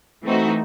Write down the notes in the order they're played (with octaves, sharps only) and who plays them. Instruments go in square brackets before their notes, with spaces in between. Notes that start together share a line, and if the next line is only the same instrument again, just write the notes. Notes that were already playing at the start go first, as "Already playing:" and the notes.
[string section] E3 A3 C4 D#4 F#4